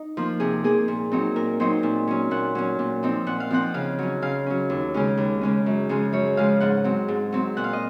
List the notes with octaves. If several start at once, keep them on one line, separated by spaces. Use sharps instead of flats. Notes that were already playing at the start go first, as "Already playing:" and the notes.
Already playing: D#4
F3 A#3
C3 G#4
F3 A#3 G#4
A#2
F#3 C4 D#4
A#2 A#4
F#3 C4 D#4 C5
A#2
F#3 C#4
A#2 F#5
F#3 C#4
A#2
F3 C4 D#4
A#2 F#5
F5
F3 C4 D#4 F#5
C#3 F5
F#3 C#4
C#3 F5
F#3 C#4
D#2
C#3 G#3 C#4
D#2
C#3 G#3 C#4
F#2
C#3 F3 G#3
F#2 C#5
C#3 F3 G#3 F5
G#2 F#5
F#3 C4
G#2
F#3 C4
A#2 F#5
F5
D#5